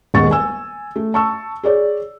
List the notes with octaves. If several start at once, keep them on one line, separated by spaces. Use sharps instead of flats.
D#1 G#3 B3 F#5 C#6 A6
G#5 E6
A3
A5 C#6 E6
G#4 C#5 D5